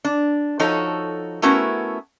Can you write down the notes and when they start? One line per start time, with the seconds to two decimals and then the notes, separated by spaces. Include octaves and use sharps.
0.05 D4
0.59 F3 D#4 F#4 A4 C#5
1.42 A3 B3 C#4 E4 F#4 A#4